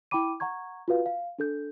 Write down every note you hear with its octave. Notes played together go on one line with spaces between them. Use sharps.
E4 G5 B5 D6 D#7
F#5 A#5 C#6 G#6
F4 F#4 B4 F5
F5
D4 A4 G6